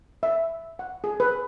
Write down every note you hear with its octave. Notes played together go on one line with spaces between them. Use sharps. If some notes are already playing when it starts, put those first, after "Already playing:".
E5
F#5
G#4
B4